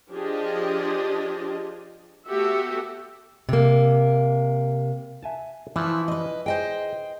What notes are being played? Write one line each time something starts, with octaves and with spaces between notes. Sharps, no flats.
F3 D4 F4 G4 G#4 D#5
A3 B3 F#4 G4 A4 E5
C3 A#3
E5 G#5 A5
E3 F3 E4
B4 D#5
G#4 C5 D#5 G5